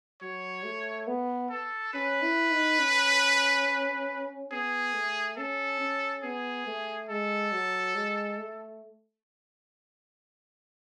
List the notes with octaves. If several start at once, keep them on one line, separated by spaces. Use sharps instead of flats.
F#3 C#5
A3
B3
A4
C#4 B4
E4
D#4
C#4
B3 G#4
A3
C#4 A4
C#4
B3 G#4
A3
G#3 A4
F#3
G#3
A3